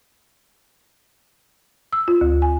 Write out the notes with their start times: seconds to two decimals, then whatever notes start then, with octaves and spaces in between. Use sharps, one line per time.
1.93 E6
2.08 F4
2.21 D2
2.42 G#5